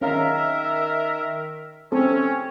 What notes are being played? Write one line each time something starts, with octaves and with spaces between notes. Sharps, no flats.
D#3 C#4 A#4 E5 F5 A#5
C4 C#4 A4